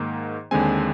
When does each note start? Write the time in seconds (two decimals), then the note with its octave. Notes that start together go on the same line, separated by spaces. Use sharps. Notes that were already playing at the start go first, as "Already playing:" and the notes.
Already playing: G#2 D#3 A#3 D#4
0.51 D#2 D3 G#3 C4 G#5